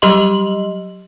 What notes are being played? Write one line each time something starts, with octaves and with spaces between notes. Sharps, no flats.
F#3 G3 G4 D#5 C6 F#7